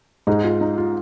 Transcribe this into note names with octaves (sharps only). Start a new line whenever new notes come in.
G#2 G#3 D#4
F4
D#4
F4